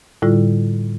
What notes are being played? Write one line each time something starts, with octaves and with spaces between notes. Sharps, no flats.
A2 D3 G3 E4 F4